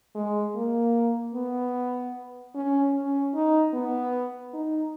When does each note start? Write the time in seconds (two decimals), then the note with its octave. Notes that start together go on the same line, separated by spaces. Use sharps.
0.15 G#3
0.56 A#3
1.34 B3
2.55 C#4
2.94 C#4
3.35 D#4
3.74 B3
4.54 D#4